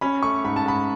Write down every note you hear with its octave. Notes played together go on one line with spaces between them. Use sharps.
C#4 B5
A3 C#6
G#2 B5
A5
G#2 B5